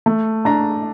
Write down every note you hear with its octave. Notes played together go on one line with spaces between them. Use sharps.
A3
D4 A#5